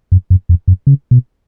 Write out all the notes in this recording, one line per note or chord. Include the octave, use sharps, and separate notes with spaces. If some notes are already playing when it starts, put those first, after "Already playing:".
F#2
F#2
F2
F#2
C#3
B2